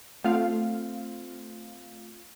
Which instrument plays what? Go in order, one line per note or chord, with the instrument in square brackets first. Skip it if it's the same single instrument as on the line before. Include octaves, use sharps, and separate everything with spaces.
[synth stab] A3 F4 F5 [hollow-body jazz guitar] C4 F#5